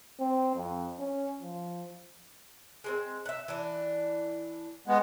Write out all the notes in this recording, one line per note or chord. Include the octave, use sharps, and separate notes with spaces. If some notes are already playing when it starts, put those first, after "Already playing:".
C4
F2
C#4
F3
G#3 A#3 C4
E5 F#5
E3 D4
G#3 B3